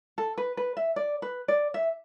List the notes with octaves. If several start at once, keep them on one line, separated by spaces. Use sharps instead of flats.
A4
B4
B4
E5
D5
B4
D5
E5